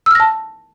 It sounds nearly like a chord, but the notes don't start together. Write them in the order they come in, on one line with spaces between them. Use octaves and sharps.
E6 F6 A#6 A5